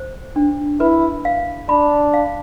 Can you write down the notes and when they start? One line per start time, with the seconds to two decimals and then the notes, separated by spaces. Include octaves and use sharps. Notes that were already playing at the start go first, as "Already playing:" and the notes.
Already playing: C5
0.36 D4
0.80 E4 B4
1.25 F5
1.69 D4 B5
2.14 F5